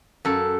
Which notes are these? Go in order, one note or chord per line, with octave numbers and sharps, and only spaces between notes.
F#2 A4